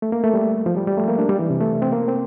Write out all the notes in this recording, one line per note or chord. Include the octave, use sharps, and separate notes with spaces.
A3
A#3
A3
G3
F3
G3
G3
A3
A#3
D4
G3
E3
C3
A3
C4
A#3
C4